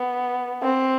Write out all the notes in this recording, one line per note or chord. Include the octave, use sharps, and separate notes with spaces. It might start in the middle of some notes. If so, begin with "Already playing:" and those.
Already playing: B3
C4